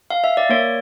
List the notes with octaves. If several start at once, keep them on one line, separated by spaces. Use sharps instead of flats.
F5
E5
D5
A#3 C#5